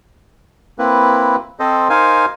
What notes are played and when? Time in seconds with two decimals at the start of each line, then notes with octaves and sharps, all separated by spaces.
0.79 A#3 C4 E4 B4
1.60 C4 A4 C5 D#5
1.90 D#4 A#4 C5 F5 G#5